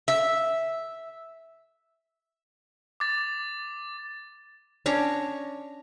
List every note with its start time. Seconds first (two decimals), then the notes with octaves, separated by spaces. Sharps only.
0.08 E5
3.00 D6 A6
4.86 C#4 D4 C#5 A#5